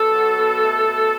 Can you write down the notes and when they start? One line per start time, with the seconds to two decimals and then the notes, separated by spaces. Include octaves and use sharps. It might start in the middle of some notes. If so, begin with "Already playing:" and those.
Already playing: B2 A4
0.13 F#3
0.38 B2
0.62 A3
0.87 B2